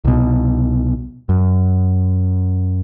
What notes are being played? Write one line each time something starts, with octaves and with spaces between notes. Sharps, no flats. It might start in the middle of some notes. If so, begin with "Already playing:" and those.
C2 B2
F#2